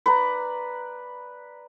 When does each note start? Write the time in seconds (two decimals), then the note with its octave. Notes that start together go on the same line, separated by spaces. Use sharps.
0.06 B4 D5 A#5